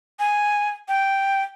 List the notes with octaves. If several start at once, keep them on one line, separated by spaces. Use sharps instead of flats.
G#5
G5